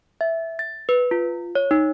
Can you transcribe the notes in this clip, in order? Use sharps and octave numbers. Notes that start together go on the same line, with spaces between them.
E5
A6
B4
F4
C#5
D#4